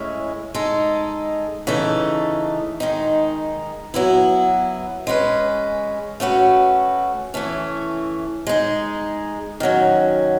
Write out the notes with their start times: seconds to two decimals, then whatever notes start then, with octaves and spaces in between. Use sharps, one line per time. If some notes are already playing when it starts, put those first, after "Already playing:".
Already playing: A2 G#3 C#4 E4
0.54 G#3 D#4 A4
1.67 C#3 E3 A3 D#4 A4
2.80 D#3 G#3 D#4
3.94 F#3 B3 E4
5.07 G#3 C#4 F#4 B4
6.20 A3 C#4 F#4 B4
7.34 E3 A3 C#4
8.47 G#3 D#4 G#4
9.60 D#3 F#3 C#4